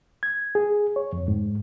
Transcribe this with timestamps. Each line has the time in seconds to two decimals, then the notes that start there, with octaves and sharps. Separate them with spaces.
0.23 G#6
0.55 G#4
0.96 C#5
1.13 F2
1.28 G#2